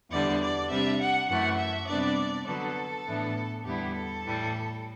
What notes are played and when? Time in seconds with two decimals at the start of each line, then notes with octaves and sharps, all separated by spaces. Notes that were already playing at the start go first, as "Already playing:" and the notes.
0.10 E2 D3 G3 D4 D5
0.41 D5
0.69 C3 G3 D4 E5
1.00 F#5
1.28 F#2 E3 A3 F#5
1.58 E5
1.88 C3 G3 B3 D4 D5
2.46 D3 F#3 B3 A4
3.06 A2 E3 B3 D4
3.65 E2 D3 G3 B3 E4 G4
3.94 A4
4.24 A2 E3 G3